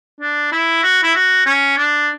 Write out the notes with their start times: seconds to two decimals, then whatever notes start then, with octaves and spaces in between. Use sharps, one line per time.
0.20 D4
0.52 E4
0.83 F#4
1.03 E4
1.15 F#4
1.46 C#4
1.78 D4